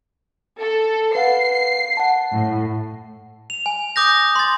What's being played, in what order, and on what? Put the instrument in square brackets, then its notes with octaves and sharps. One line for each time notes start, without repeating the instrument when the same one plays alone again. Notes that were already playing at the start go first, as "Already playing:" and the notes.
[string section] A4
[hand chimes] B4 F5 F#5 [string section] C7
[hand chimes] F#5 A5
[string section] A2
[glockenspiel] F7
G#5
D6 D#6 G6 A#6
C6 A6